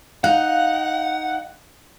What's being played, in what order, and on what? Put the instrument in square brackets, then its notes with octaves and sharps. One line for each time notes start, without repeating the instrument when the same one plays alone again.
[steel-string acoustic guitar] D#4 [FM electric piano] F5 F#6 [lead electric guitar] F#5